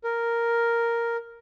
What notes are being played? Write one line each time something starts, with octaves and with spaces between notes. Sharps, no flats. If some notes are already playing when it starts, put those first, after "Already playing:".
A#4